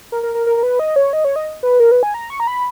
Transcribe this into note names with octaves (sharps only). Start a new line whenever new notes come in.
A#4
A#4
A#4
A#4
A#4
B4
D#5
C#5
D#5
C#5
D#5
B4
A#4
B4
G#5
A#5
C#6
A#5
B5